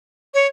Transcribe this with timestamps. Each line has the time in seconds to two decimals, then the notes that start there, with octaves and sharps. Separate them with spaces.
0.34 C#5